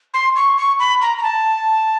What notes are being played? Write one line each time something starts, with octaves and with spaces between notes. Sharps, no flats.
C6
C#6
C#6
B5
A#5
A#5
A5